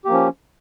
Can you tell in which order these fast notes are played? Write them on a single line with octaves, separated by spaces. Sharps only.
G4 A#3 F3 C#4